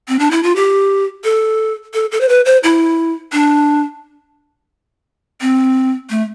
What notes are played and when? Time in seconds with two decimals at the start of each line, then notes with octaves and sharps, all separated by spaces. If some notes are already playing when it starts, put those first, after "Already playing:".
0.08 C4
0.19 D4
0.31 E4
0.43 F4
0.56 G4
1.24 A4
1.94 A4
2.12 A4
2.21 C5
2.29 B4
2.45 C5
2.64 E4
3.33 D4
5.41 C4
6.10 A3